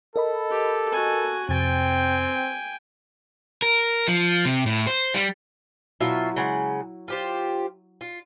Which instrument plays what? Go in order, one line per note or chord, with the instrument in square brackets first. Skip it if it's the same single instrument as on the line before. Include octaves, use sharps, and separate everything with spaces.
[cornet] A4 [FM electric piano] A#4 D#5 B5
[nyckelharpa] G4
F#4 G#5
[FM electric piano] F2 C3 A6 [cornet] C4 [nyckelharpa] G5 G#5
[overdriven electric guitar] A#4
F3
C3
A2
C5
G3
[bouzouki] B2 F4 E5 [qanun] F#3 E4
[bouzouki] C#3 G#3 F#5
F4 G4 C5
F4